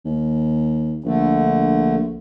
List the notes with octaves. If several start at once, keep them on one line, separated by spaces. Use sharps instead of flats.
D#2
A#1 D3 A3